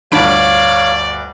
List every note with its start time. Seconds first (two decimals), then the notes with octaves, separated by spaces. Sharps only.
0.12 G1 D2 D4 C#5 D5 F5 B5 D7